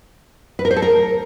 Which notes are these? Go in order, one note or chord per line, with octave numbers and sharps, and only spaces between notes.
B4
A#4
C5
A4
A#4